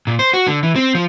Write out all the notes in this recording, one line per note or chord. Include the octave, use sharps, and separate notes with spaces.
A#2
C5
F#4
D3
E3
C4
F3